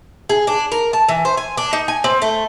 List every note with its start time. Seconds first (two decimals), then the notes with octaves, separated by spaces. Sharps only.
0.29 G#4
0.47 D4
0.72 A#4
0.93 A5
1.09 E3
1.25 C5
1.37 G#5
1.57 D4
1.73 D#4
1.88 G#5
2.04 C4
2.22 A3